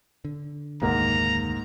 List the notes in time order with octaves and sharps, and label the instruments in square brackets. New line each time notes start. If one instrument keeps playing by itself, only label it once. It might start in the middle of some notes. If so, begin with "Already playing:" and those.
[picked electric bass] D3
[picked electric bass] F1 D2 D#3 [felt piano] G#2 A#3 F#5 [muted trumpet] A#5